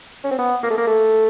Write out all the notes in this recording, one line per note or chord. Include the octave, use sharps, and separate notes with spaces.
C#4
C4
B3
A#3
A3
A#3
A3